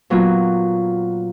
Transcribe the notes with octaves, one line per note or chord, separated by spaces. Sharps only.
A#2 F#3 B3 F4